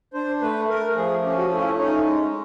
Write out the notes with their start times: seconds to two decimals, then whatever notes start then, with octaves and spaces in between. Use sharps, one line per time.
0.14 D4 C5
0.41 A3 B4
0.68 A3 A#4
0.95 F3 G#4
1.23 C#4 G4
1.37 F#4
1.50 A3 E4
1.59 F4
1.63 E4
1.77 C#4 D#4
2.04 G#3